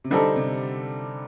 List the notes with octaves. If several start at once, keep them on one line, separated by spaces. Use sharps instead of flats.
C3
D3 G3 C4 D#4 A4
C3